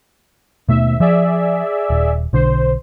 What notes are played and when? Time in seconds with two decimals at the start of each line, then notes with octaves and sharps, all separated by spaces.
0.69 D#2 B2 A3 B3 E5
1.00 F3 G#4 D5 E5
1.90 D#1
2.33 B1 D3 C5